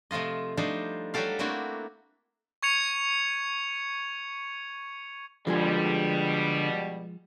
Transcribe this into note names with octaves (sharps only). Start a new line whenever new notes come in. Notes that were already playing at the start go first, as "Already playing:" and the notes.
C3 F3 A3 F4 D#5
F3 G3 A3 D4 D#4 C5
F#3 G3 F#4 G4 A4 F5
A3 A#3 C4 D4 E4 F#4
C#6 G#6 C#7 F7
B2 D3 F3 G3 G#3 G#4